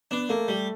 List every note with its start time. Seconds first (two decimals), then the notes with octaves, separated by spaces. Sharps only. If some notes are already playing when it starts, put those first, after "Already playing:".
0.11 B3 D4
0.29 A3 A#3
0.48 G3